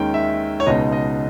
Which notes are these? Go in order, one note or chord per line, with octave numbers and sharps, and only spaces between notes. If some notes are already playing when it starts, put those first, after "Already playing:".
Already playing: D#2 D#3 G#3 C#4 G5
E5
C#5
C#2 B2 G#3 D#4 D#5
D#5